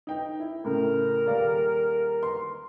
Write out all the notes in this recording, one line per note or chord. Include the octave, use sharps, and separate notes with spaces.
D#4 G5
E4
A2 C#3 A#4
D#1 D5 F5
C6